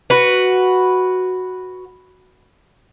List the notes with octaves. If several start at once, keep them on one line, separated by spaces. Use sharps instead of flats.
F#4 B4